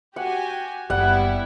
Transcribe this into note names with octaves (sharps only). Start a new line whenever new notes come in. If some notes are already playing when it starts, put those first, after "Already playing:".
F#4 G4 F#5 G#5
F#1 G3 B3 E4 F#5